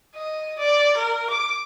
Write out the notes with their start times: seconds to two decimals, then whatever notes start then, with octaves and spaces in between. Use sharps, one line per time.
0.15 D#5
0.59 D5
0.97 A#4
1.30 D6